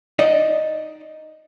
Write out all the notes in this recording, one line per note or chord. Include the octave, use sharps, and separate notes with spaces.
D#4 D5 D#5